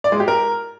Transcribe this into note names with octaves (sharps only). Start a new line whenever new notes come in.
D5
G#3
G4
A#4